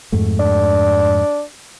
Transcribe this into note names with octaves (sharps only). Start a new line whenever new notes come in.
F2 G#2 A3
D4